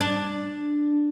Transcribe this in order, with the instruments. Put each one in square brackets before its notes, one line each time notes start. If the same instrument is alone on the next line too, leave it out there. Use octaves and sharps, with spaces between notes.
[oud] D4